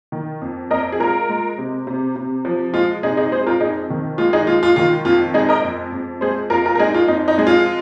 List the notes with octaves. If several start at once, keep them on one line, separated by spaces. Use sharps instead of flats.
D#3
F2
F2 A#4 D#5
G#4
G#3 F4 A#4
G#3
C3
C3
C3
F3
G#3 F4
C3 D#4 G#4
D#4 G#4
G#3 G#4 C5
F4 A#4
F2 D#4 G#4
D#3
G#3 F4
D#4 G#4
G#3 F4
F4
D#3 F4
F2 F4
G#3 D#4 G#4
A#4 D#5
F2
F2
G#3 G#4 C5
F2 F4 A#4
F4 A#4
A#4
G#3 D#4 G#4
F4
F2 D#4
D#4
G#3 G#4
F4